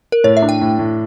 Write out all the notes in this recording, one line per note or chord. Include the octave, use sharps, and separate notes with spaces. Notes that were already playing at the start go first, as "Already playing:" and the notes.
A#4
A2 C#5
E5
D4
G5
A2
A2